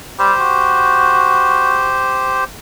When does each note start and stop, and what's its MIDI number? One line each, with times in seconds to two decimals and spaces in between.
0.19 0.33 55
0.19 2.44 67
0.19 2.44 72
0.40 1.92 66